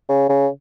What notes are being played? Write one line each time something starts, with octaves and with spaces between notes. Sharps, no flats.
C#3
C#3